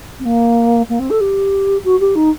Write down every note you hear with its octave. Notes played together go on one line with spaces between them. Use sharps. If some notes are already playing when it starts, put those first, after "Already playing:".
C4
A#3
A#3
C4
A4
G4
F#4
G4
D#4